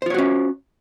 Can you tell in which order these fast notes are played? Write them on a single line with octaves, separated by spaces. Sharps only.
C5 F4 C#5 F#4 C#4